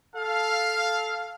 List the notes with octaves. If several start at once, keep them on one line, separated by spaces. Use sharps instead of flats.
A4 F5